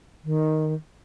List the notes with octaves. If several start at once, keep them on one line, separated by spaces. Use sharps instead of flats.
D#3